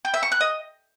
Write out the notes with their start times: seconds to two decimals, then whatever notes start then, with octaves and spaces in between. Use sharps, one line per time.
0.05 G5
0.14 E5
0.23 C#6
0.32 F#6
0.41 D#5